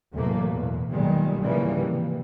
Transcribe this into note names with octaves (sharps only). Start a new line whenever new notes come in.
E2 A2 C3 F#3 A3 A#3
E2 B2
B1 A#2 D#3 G3 G#3
G#2 C#3 E3 F3 G3 A#3
C3